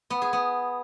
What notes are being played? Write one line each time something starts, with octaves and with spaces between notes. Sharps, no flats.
B3
G#4
B3